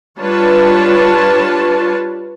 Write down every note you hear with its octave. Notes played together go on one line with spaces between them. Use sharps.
G3 D4 F4 B4 C#5 A5